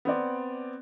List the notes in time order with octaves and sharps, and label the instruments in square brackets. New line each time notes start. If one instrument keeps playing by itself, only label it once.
[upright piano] B3 C4 D5